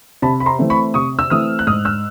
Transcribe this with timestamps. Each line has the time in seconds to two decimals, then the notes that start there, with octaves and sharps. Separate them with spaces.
0.22 C3 A5 B5
0.40 B5
0.46 A#5 C6
0.59 E3 A3 C4
0.70 B5 C#6
0.94 C3 C#6 D#6
1.19 E6
1.30 E3 A3 C4 D#6 F6
1.59 F#6
1.67 G#2 D#6 F6
1.85 E6 F#6